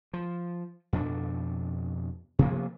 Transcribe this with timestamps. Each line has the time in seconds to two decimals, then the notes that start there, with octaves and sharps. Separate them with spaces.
0.13 F3
0.93 F2 B2 B3 D4
2.39 C3 F3 A#3 B3